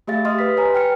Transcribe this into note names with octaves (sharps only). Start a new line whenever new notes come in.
A3 G4 G#4 E5 F5 A6
G4 D#5 C6 D#6 F6
B4 B6
B4 C#5 G#5 A#5
G5 F6 C#7